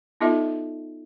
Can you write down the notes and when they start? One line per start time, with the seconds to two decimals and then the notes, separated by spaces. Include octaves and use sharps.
0.21 B3 D#4 F4 A4 D#5 E5